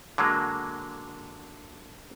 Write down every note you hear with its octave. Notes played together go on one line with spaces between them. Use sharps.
D3 F#3 G#3 A#3